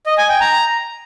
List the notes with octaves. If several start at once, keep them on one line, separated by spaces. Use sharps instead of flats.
D#5
G#5
G5
A#5